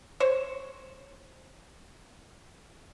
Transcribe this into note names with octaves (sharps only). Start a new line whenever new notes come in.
C5 C#5